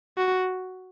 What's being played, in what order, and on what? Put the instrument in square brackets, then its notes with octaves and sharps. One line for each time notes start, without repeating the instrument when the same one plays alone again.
[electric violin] F#4